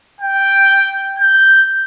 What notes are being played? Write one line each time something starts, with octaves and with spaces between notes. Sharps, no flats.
G5
G6